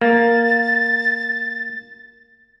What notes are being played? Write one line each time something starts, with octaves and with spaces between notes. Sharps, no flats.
A#3 A6